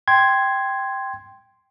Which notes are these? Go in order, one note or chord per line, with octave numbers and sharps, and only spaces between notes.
G5 C6 G#6